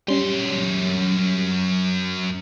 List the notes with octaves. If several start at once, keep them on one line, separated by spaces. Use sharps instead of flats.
F#2 G3 C#4 C6